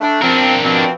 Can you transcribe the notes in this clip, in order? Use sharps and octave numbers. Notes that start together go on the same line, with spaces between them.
A3 D4
F3 C4 D4 A#4
B2 F3 C4